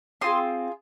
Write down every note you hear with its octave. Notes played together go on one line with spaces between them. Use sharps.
C4 F4 G#4 C6 D#6